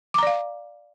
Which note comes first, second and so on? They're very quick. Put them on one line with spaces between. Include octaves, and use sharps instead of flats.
D6 A#5 D5 F5